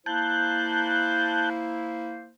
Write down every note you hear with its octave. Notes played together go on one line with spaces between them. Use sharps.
A#3 E4 C5 A5 F#6 G6